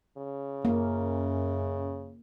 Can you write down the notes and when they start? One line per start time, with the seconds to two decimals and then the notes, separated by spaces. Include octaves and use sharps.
0.18 C#3
0.65 F#2 A#3